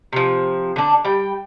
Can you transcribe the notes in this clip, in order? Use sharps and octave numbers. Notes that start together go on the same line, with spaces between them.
C3 F3
D3 D4
G3 G5